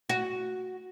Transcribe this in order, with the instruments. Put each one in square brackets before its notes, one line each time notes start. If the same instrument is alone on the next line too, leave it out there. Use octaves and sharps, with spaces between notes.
[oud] F#4